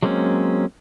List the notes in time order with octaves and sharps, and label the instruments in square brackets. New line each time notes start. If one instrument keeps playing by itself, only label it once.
[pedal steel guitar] F#3 G#3 A#3 C4 C#4